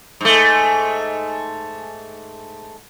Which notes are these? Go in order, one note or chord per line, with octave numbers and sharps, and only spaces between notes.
G#2 A3